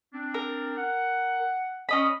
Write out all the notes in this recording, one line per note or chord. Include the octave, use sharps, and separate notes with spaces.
C4 D4
A#4
F#5
C#4 D#5 B5